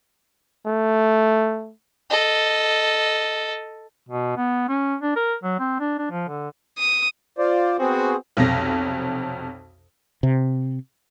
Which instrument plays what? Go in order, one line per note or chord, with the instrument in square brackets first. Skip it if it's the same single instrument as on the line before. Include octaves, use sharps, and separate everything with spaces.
[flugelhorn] A3
[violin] A4 D#5
[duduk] B2
B3
C#4
D4
A#4
F#3
C4
D4
D4
F3
D3
[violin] D#6
[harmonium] F4 C5 D5
[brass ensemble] B3 C4 F#4 [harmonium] G#4 C5
[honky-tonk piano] B1 F2 C3 A#6
[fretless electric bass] C3